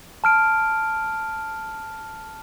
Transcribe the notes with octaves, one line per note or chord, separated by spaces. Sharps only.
A5 F6 D7